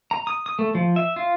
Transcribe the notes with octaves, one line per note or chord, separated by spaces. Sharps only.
A#5
D#6
D#6
A3
F3
E5
F4